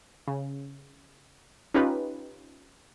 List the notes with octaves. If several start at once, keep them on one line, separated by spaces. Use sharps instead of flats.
C#3
C#4 D#4 F4 G4 B4